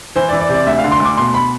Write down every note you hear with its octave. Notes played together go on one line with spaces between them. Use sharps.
E3 C5
D5
E3
D5
C3
D5
D2 E5
F5
D3
C6
D2 D6
B2 C6
B5